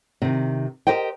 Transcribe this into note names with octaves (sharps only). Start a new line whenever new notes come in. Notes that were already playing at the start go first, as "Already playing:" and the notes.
C3 D#3
G4 G#4 A#4 C5 D#5 G5